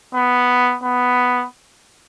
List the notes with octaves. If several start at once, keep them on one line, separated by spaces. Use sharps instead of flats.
B3
B3